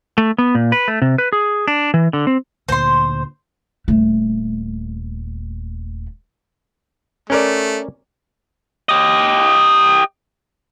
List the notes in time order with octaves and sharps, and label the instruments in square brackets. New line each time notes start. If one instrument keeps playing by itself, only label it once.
[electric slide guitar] A3
B3
A#2
B4
A3
C3
B4
G#4
D4
E3
D3
C4
[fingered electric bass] D2 A#2 D3 [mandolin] C5 C6
[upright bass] D#1 A3
[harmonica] A3 [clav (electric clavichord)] C#4 A#4 D5
[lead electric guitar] G4 D#5